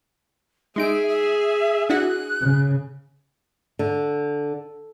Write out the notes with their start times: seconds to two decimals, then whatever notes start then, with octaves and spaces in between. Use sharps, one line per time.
0.76 G#3 D#4 G#4 E5 D7
1.09 E5
1.90 D4 E4 F#4 F#6
2.41 C#3
3.79 D3